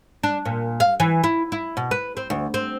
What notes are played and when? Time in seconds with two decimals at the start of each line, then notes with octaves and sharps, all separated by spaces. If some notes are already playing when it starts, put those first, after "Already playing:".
0.24 D4
0.45 A#2
0.80 F5
1.00 E3
1.24 E4
1.52 E4
1.77 B2
1.91 B4
2.17 C4
2.30 D2
2.54 C4